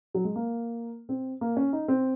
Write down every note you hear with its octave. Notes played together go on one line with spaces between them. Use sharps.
F#3
G#3
A#3
C4
A#3
C#4
D#4
C4